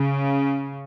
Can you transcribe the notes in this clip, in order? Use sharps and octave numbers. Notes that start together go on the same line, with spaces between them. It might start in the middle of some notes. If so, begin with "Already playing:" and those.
Already playing: C#3